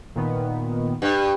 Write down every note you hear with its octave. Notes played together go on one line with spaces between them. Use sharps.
A#2 D#3 B3
G2